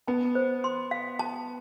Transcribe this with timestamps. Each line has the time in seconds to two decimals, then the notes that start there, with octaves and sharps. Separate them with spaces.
0.08 B3 A5
0.35 C5
0.64 C6
0.91 F5
1.19 A5